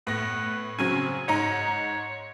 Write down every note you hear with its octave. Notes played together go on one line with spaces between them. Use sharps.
A2 B3 A#6
C#3 F#3 C4 G#5
G#2 D#4 C#5 A#5